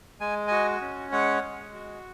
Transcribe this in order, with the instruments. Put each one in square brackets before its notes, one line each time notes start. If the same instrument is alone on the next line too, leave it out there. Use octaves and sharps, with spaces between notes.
[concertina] G#3 G#5
F#4 D#5 G#5
C#4
G#3 C#5 F#5
G#3
F#4